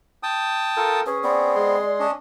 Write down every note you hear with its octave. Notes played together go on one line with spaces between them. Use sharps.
G5 A5 D#6
F4 A4 A#4
C#4 G#4 B4
B3 C4 D5
G#3 G#4 C6
C#4 D4 D#5